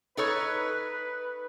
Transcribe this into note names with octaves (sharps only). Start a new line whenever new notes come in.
D#4 A4 B4 C#5